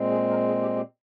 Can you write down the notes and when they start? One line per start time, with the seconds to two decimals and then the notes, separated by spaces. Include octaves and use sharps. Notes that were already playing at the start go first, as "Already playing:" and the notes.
Already playing: A#2 G#3 C4
0.11 G#4
0.29 A#4
0.48 G#4
0.62 G4
0.76 G4